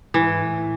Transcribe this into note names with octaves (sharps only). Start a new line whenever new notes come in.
G#2 E3
A2